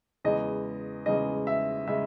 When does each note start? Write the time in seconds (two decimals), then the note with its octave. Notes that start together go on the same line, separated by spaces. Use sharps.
0.25 E2 C#3 G#3 D#5
1.06 E2 C#3 G#3 D#5
1.47 E5
1.87 C#3 G#3 E5